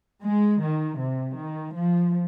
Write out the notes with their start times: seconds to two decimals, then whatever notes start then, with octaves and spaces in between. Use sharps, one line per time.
0.22 G#3
0.61 D#3
0.98 C3
1.36 D#3
1.75 F3